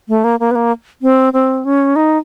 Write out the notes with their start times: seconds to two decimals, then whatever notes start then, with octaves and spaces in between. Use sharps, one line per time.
0.09 A3
0.24 A#3
0.40 A#3
0.51 B3
0.55 A#3
1.02 C4
1.33 C4
1.65 C#4
1.96 D#4